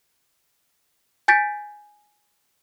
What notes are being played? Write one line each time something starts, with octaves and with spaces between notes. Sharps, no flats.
G#5 G6 A6 B6 D7